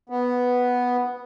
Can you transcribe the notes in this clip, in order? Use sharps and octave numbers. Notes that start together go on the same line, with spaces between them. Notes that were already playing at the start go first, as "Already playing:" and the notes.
B3